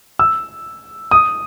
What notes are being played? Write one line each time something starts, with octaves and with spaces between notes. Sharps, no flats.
E6
D#6